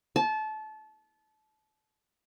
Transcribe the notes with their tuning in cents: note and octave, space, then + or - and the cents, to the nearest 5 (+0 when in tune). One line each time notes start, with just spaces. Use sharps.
A5 -25